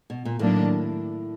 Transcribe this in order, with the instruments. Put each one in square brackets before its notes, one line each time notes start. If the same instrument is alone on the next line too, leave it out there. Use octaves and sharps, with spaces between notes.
[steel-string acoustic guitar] B2
A#2
[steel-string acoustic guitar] A2 [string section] D#3 F#3 A#3 D4